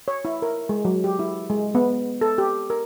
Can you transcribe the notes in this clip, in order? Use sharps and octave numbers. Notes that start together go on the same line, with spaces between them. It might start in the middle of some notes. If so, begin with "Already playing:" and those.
C#5
E4
A#4
G#3
F#3
G4
E4
G#3
B3
A4
G4
A#4